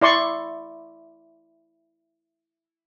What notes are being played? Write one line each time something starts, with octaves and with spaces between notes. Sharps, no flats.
E4 D5 C6 C#6